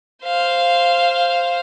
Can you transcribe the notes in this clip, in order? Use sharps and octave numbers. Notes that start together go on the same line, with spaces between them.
C5 F5